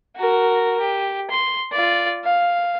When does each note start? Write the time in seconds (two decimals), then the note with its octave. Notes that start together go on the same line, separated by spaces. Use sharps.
0.17 F#4 A#4
0.80 G4
1.31 C6
1.72 F4 D5
2.24 F5